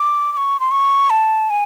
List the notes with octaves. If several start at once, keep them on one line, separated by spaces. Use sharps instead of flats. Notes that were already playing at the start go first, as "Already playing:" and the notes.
Already playing: D6
D6
C#6
C6
C#6
A5
G#5